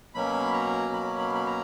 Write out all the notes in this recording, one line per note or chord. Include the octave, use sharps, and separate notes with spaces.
B2 F#3 A#3 C#4 B5
A#5
B5
B5
B5
A#5